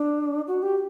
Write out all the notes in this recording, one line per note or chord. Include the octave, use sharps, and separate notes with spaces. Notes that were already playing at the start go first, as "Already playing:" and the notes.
Already playing: D4
F#4
G4